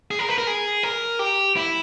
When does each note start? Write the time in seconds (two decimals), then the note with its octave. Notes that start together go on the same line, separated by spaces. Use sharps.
0.11 G#4
0.19 A#4
0.29 B4
0.38 A#4
0.47 G#4
0.83 A#4
1.19 G4
1.57 E4